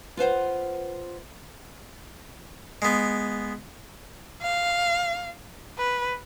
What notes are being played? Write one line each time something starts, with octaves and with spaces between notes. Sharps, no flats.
F4 B4 C5 F#5
G#3 B3
F5
B4